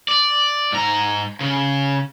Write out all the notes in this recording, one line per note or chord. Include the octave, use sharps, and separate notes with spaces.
D5
G#2 A#5
C#3